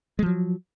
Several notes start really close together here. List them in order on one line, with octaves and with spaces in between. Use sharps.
G#3 F3 F#3